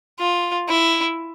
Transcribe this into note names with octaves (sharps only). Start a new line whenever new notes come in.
F4
E4